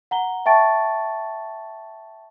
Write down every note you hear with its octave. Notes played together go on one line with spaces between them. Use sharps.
F#5 A#5 G7
E5 G5 A5 C#6 A6 D7